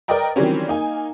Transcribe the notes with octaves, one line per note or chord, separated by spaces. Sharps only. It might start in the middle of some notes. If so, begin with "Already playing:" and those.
A#4 B4 D5 D#5 G5 A#5
D#3 E3 F#3 G3 C4 C#4
A#3 D#4 G#5